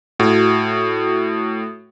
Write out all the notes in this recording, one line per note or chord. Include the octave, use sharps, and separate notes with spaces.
A2 F#4